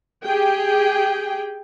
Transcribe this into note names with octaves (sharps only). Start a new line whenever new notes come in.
G4 G#4 G5